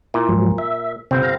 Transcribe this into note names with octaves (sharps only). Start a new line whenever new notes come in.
A#2 E4
G#2 F3 F#3
E5
G1 C3 C4
F5 A#5